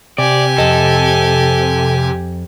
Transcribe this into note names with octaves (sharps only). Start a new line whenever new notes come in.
C3 G4 D5 G#5
F2 A4 D#5